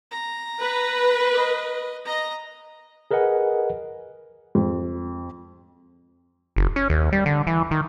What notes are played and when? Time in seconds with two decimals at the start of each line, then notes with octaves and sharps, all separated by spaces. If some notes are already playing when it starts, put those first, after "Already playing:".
0.11 A#5
0.59 B4
1.34 D#5
2.05 D#5 A#5
3.11 G#4 A#4 B4 D#5 F#5 G#5
4.55 F2
6.56 F#1
6.76 C#4
6.90 D#2
7.12 G3
7.26 D3
7.47 E3
7.71 D#3